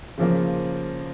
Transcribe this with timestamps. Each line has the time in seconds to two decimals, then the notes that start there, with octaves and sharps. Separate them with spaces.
0.18 C#3 F3 A#3